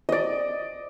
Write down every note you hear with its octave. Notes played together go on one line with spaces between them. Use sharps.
D5 D#5